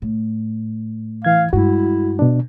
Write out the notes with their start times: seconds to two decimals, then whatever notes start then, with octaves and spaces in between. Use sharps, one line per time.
0.02 A2
1.25 E3 F5 G#6
1.53 G2 G#3 E4 F#4
2.19 B2 D4